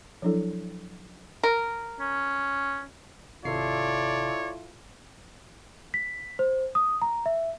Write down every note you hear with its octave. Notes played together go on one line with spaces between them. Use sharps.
F3 F#3 D4 E4 A4
A#4
C#4
G#1 C3 E4 F4 A4 C#5 D5 C7
B6
C5
D#6
A#5
E5